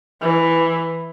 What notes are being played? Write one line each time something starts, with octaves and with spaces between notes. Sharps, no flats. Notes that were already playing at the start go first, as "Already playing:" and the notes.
E3